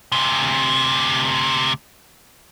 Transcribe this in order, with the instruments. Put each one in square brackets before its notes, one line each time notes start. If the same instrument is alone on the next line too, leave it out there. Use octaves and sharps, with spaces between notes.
[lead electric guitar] D2 C3